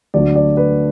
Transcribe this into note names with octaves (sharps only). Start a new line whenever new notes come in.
D2 D3 F#3 A3 D5
D5
B4